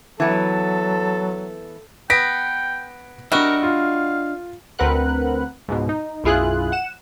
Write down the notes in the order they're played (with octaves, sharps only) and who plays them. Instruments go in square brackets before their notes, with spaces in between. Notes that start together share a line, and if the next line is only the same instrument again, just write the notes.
[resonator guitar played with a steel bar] E3 B3 [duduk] F#3 [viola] A4 [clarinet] A5
[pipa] B3 [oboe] G5 [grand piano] A#6 B6 D7
[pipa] G3 F#4 [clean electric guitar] D4 D#5 E5 [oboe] A#4
[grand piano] F4 [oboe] F5
[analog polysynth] D2 C4 A#4 B4 F#5 F#6
C#2 G#2 B2
D#4
B1 F#2 E4 F4 G#4 F#6
F#5 E7